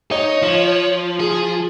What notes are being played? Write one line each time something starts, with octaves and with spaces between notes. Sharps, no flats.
D#4 C#5
F3
G#4